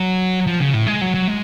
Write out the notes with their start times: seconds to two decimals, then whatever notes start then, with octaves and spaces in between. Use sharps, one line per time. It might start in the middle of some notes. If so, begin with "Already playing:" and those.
Already playing: F#3
0.47 F3
0.60 C#3
0.73 A2
0.87 G#3
1.01 F#3
1.14 F#3
1.28 G#3